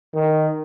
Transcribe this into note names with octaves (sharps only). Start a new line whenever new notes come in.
D#3